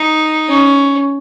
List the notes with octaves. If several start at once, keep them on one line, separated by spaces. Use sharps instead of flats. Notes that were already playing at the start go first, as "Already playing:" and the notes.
Already playing: D#4
C#4